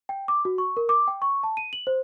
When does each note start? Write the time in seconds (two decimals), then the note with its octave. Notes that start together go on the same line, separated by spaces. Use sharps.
0.09 G5
0.28 D6
0.45 F#4
0.58 C#6
0.77 A#4
0.89 D6
1.08 G5
1.22 C#6
1.43 A5
1.57 D#7
1.73 F#7
1.87 C5